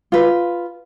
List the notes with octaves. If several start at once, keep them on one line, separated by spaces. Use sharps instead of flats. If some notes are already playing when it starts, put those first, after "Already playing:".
F4 B4